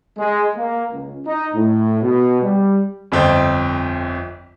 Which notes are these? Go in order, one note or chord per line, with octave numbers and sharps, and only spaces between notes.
G#3
A#3
C#2
D#4
A2
B2
G3
G1 F2 F3 C4 G5